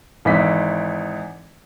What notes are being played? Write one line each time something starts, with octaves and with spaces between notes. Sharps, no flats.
G#1 E3 D#4 B6